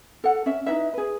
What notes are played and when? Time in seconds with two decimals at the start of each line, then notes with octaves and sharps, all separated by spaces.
0.24 A4 F#5
0.46 C#4 E5
0.66 D#4 E4 B4 E5
0.94 G#4 B4